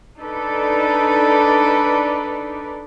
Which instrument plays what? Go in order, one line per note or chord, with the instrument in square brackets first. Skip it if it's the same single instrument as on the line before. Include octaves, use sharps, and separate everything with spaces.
[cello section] D4 D#4 A4 B4 D5